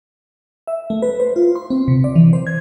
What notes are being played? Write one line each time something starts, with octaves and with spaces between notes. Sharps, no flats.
E5
A3
B4
C5
F4
C6
C4
C3
D5
E3
C5
G#6